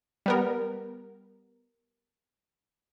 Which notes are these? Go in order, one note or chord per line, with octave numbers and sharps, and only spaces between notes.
G3 B3 A#4